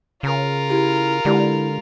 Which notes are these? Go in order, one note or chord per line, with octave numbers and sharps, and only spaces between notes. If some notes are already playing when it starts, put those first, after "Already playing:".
C#3 F4 A#4
E4 G4
D3 G#3 E4 G4 D5